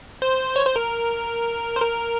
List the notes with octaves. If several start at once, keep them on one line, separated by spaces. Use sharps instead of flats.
C5
C#5
C5
A#4
C5
A#4